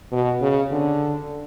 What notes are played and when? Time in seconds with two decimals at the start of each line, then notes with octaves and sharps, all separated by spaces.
0.12 B2
0.41 C#3
0.72 D3